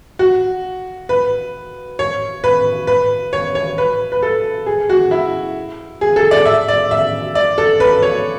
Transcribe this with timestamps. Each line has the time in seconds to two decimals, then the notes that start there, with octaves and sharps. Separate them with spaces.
0.19 F#4
1.09 B4
1.99 C#5
2.44 B4
2.87 B4
3.33 C#5
3.55 C#5
3.78 B4
4.12 B4
4.22 A4
4.66 G#4
4.90 F#4
5.11 E4
6.01 G#4
6.16 A4
6.31 D5
6.46 E5
6.68 D5
6.91 E5
7.35 D5
7.58 A4
7.80 B4
8.02 C#5